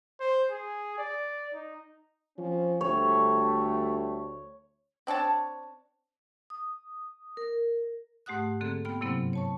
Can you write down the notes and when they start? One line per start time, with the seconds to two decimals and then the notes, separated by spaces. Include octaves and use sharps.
0.20 C5
0.50 G#4
0.98 D5
1.54 D#4
2.38 F3 C4 C#4
2.81 D2 G3 A3 C#5
5.07 C4 D4 C#5 A5
6.50 D#6
7.37 A#4
8.26 G#2 A3 G4 F#5 D#6 F#6
8.61 D3 A#3 C4 G#4 A4
8.85 B3 G5 B5 F6
9.01 G2 C3 F#3 A#3 C4 E4
9.33 C#5 A5 C#6